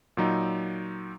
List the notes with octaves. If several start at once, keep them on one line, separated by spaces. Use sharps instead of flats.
A#2 F#3 D#4